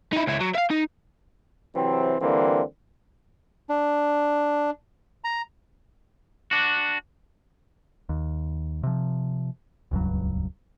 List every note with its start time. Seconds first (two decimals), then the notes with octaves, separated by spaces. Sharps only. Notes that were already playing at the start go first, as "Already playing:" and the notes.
0.13 D#4 E4
0.27 C#2 E4
0.41 F#3
0.55 E5 F5
0.71 D#4
1.76 C3 E3 F#3 C4
2.21 D3 E3 G3 A#3 C4
3.69 D4
5.24 A#5
6.51 D4 F#4
8.09 D#2
8.83 C3 F3
9.91 D#1 C#2 G2 F#3